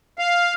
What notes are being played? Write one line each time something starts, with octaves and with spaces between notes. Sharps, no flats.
F5